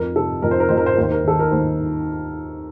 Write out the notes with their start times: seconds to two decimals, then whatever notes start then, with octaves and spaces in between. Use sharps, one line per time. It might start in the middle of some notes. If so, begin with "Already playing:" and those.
Already playing: F2 F3 A#4
0.16 C3 A4
0.42 F2 A#4
0.51 C5
0.60 A#4
0.69 F2 C5
0.77 A#4
0.86 C5
0.94 D#2 A#4
1.03 C5
1.12 A#4
1.24 D#3 A4
1.39 A#4
1.51 D#2 C5